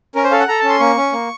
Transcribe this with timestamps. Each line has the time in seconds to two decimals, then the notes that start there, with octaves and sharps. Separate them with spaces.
0.15 C#4 A#4
0.24 C5
0.31 A4 F5
0.40 F#5
0.48 A4 A#5
0.59 C#4 A5
0.69 C6
0.80 A#3 C#6
0.97 C#4
1.12 A#3